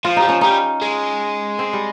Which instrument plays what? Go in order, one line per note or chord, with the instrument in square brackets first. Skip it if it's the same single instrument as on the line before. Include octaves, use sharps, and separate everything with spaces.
[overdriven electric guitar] F3 [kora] F4
[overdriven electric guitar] G3 [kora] D#4
[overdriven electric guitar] F3 [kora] C#4
[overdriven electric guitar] G3 [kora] D#4
[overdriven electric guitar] G#3
[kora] C4
G3